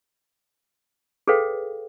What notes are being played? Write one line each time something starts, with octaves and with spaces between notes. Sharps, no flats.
G#4 A4 B4 C#5 F5 G5